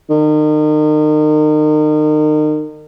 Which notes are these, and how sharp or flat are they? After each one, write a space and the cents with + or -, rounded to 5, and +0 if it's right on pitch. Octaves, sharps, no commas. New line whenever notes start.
D#3 -35